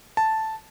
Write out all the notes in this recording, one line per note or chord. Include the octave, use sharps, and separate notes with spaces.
A5